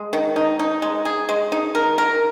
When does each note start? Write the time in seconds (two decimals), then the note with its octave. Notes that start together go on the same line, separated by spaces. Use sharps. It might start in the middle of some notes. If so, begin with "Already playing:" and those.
Already playing: G#3
0.13 D#3
0.36 D#4
0.59 D#4
0.82 G#3
1.05 G#4
1.29 G#3
1.52 D#4
1.75 A#4
1.98 A#4